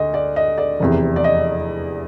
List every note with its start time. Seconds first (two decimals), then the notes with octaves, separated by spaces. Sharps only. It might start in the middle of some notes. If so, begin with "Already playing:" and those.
Already playing: D2 D#5
0.14 D5
0.36 D#5
0.58 D5
0.80 F1 E2 C3
1.16 D5
1.24 D#5